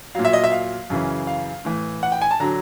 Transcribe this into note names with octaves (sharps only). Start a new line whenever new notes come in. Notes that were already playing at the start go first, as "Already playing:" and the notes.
A#2 F#3 F5
E5
D#5
E5
F5
F#2 C#3 E3
F5
A2 E3
F#5
G5
G#5
A5
D3 F#3 A#5